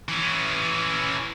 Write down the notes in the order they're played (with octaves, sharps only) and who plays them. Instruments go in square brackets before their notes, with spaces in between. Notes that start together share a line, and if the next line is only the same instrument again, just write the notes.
[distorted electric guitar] E3 C#4